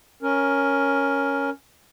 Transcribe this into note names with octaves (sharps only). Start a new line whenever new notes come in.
C#4 A#4